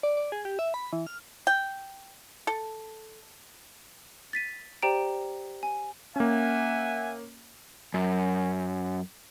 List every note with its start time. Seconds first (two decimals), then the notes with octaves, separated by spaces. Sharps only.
0.03 D5
0.17 D5
0.32 G#4
0.45 G4
0.59 E5
0.74 B5
0.93 E3
1.07 F6
1.47 G5
2.47 A4
4.33 A6 B6 D#7
4.82 G4 C5 D5 G5 A#5 D7
5.63 G#5
6.16 A#3 C#4 E5 F#5 G#5
7.94 F#2